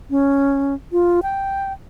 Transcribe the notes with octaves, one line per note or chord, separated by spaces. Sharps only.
C#4
F4
G5